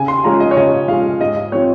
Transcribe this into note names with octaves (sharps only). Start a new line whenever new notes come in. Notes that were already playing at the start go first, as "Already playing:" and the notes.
Already playing: C#3 G#5
C6
F3 G#3 C#4 A#5
D#5
C#5
C#3 D#5
F3 G#3 C#4 F5
G#2 D#5
D#5
F3 C4 C#5